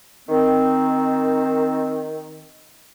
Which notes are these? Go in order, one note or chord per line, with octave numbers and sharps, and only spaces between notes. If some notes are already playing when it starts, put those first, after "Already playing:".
D#3 C4